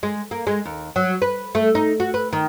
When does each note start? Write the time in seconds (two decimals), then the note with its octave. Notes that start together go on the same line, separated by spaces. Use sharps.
0.03 G#3
0.31 A#3
0.47 G#3
0.65 D#2
0.96 F#3
1.22 B4
1.55 A3
1.75 D#4
2.00 F#4
2.14 B4
2.33 D#3